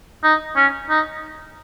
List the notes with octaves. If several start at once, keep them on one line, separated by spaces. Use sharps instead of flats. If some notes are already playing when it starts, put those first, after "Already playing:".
D#4
C#4
D#4